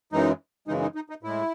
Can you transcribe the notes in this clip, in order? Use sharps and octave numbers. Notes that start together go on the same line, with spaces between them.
F#2 C#3 E3 G#3 D#4
F#2 C#3 E3 G#3 D#4
D#4
D#4
D#4
A2 G#3 E4